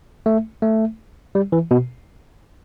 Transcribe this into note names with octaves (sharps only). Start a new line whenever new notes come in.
A3
A3
G3
E3
B2